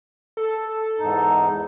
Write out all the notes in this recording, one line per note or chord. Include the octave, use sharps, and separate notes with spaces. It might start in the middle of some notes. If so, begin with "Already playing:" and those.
A4
E2 G#2 D#4